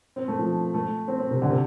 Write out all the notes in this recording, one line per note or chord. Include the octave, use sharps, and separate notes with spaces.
C4
A3
F3
A3
C4
C4
C3
D3
C3